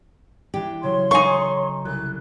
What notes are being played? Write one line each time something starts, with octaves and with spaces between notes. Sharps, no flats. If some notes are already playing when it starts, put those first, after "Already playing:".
E3 D4 G4
C#3 F#3 C#5 C6
D#4 A4 F5 G#5 C#6
C2 F#6